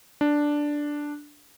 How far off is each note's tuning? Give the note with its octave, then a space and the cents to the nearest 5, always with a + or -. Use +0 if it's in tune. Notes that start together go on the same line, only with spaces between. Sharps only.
D4 +0